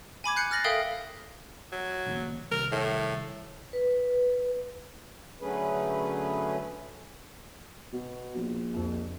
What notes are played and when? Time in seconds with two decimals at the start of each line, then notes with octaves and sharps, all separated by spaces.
0.24 G#5 B5 D6 G#6
0.36 F#6 G6 C7 C#7
0.51 F6 A6 A#6 F#7
0.64 A4 A#4 E5 F5 G5 D#6
1.72 F#3
2.06 A#1 D#2 C#3
2.51 C2 D#3 G3 A#4
2.72 A2
3.73 B4
5.41 D3 F#3 A3 C#4 G#4 B4
7.93 B2
8.36 A#1
8.74 C2 F2